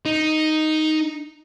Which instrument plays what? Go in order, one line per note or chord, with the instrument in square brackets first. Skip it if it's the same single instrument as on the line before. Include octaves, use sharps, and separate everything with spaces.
[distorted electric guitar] D#4